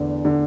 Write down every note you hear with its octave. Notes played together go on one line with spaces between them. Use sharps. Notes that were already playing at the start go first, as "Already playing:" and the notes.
Already playing: E2 D3
D3